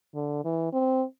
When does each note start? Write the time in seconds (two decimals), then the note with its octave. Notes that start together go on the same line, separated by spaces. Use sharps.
0.15 D3
0.45 E3
0.73 C4